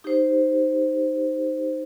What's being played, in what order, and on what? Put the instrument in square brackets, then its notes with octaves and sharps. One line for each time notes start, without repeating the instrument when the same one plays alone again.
[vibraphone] D#4 G4 C5